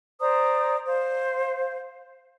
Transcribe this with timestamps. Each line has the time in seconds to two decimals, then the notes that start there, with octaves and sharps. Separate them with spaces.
0.20 C5 D5 A#5 D#6
0.86 C5 F5